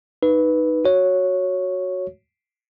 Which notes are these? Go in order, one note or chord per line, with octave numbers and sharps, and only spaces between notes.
D#4 B4
F#4 C#5